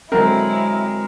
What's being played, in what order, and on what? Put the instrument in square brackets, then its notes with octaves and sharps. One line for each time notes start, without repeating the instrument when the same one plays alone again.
[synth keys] D3 F#3 C4 [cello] G#3 [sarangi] E4 [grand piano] A#4